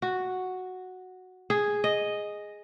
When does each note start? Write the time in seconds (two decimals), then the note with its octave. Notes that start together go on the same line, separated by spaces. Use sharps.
0.02 F#4
1.50 G#4
1.84 D#5